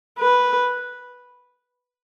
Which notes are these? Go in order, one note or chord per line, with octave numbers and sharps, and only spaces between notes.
B4